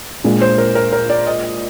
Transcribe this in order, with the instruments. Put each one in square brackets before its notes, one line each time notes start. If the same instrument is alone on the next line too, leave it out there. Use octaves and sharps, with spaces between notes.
[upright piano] A#2 G#3 D4
[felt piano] C5
A#4
A#4
A#4
D5
D#5